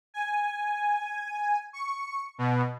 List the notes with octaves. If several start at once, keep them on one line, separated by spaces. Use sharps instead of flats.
G#5
C#6
B2